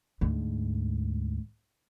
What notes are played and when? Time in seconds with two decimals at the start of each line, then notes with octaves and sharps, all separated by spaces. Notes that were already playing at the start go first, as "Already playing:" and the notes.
0.21 D2 G#2